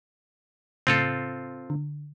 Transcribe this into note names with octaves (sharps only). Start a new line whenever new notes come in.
A2 C#3 C4 F4 A4
D3